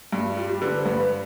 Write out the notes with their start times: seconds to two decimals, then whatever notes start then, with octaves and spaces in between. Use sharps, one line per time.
0.12 G2 F#4
0.25 F4
0.37 G3 F4
0.50 G4
0.62 D3 B4
0.78 C5
0.85 G2 B4